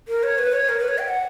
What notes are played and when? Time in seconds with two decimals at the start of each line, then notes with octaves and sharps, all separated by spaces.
0.08 A#4
0.23 C#5
0.39 B4
0.53 C#5
0.69 A#4
0.79 B4
0.88 C#5
0.98 G5
1.08 F#5